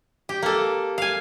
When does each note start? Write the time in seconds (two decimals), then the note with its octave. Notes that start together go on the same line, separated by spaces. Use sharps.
0.29 G4
0.43 A#3 A4
0.98 F5 G#5